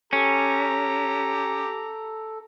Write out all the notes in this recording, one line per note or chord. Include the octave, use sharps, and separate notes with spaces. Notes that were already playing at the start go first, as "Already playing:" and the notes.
C#4 G4 A4 A#5